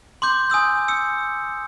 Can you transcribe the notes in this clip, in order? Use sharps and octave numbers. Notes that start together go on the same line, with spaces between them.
C6 D6 G6
G#5 D#6 E6 G6
E6 C#7